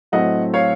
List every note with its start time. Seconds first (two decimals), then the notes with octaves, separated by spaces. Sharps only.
0.12 A2 F#3 A3 C4 D#5 F#5
0.54 C#5 F5